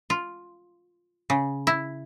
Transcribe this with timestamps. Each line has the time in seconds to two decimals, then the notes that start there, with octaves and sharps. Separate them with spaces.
0.10 F4
1.30 C#3
1.67 E4